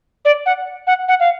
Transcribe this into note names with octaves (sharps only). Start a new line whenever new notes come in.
D5
F#5
F#5
F#5
F5